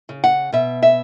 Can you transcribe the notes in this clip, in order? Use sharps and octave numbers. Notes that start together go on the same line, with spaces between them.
C#3
F#5
B2 E5
E5